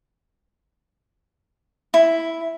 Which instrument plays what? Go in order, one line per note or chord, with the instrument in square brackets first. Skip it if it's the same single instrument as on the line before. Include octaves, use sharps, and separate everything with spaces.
[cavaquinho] E4